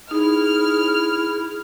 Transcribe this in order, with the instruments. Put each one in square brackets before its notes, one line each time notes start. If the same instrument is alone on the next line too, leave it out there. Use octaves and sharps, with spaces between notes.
[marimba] D#4 [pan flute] E4 [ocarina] G#4 [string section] F6